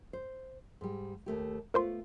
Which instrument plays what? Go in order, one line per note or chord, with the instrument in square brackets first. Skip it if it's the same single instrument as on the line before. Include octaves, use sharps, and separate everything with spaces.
[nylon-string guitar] C5
G#2 G3
D#2 A3 G4
[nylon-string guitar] A3 B3 F4 [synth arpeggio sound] A#4 C5 C6